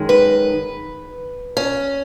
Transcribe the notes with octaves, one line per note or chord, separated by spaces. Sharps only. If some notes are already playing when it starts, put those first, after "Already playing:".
Already playing: F#2 D#3 G#3
B4
C#4